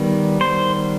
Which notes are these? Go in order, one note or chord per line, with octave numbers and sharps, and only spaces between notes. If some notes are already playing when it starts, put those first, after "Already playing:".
Already playing: D#3 G3 B3
C5